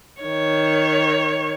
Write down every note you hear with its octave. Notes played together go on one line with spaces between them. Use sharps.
D#3 C#5